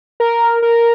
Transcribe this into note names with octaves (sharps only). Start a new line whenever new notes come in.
A#4
A#4